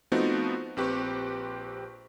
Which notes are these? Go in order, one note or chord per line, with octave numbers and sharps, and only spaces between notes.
F3 A3 B3 C4 D#4 F#4
A#1 C4 G4 B4 C#6